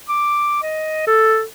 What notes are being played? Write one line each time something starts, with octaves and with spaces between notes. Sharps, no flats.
D6
D#5
A4